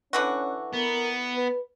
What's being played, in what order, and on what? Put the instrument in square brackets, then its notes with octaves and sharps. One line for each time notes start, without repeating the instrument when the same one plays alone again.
[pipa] D3 E3 F#4 [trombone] C#4
[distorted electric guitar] B3 [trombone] A#4
[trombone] B4